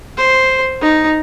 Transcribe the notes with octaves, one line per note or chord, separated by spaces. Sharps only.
C5
D#4